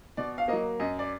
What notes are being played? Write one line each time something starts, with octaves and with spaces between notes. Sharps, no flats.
B2 D5
F5
F#3 A#3 D#5
F#2 D#5
D5